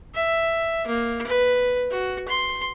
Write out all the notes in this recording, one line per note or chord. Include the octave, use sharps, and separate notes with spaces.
E5
A#3
B4
F#4
C6